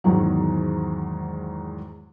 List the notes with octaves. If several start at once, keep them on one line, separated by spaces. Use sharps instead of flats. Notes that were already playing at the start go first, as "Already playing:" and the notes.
E2 G#2 D#3 F#3